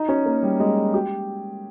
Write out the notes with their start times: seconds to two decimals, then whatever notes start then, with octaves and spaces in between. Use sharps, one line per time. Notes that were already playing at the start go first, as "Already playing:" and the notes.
Already playing: D#4
0.09 C#4
0.26 A#3
0.43 G3
0.60 G#3
0.94 G4